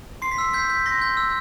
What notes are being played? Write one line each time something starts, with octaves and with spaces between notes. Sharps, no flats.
C6 C7
B6
E6 C7
G6 B6
G6
C6 A#6
G6
E6